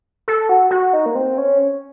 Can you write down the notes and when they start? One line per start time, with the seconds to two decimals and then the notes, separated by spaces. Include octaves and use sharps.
0.28 A4
0.49 F#4
0.71 F#4
0.93 D#4
1.06 A#3
1.15 C4
1.38 C#4